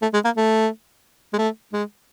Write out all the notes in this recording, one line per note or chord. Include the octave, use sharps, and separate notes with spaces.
A3
G#3
A#3
A3
G#3
A3
G#3